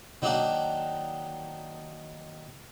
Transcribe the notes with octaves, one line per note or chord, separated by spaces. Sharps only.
D#3 F#3 A#3 D4 D#4 F#4